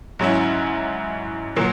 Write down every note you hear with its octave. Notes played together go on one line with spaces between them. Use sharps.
G#2 F#3 C#4 E4
A#2 F#3 A#3